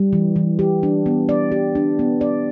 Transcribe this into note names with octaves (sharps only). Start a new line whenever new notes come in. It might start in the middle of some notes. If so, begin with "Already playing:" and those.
Already playing: G3
E3
E3
G4
D4
B3
D5
G4
D4
B3
D5